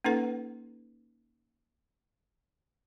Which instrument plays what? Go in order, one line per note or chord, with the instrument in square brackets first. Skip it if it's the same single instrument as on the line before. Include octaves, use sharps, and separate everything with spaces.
[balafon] A#3 C#4 D#4 A4 B4 F#5